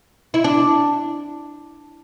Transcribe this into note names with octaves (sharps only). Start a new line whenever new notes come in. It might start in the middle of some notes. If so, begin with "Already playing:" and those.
E4
D4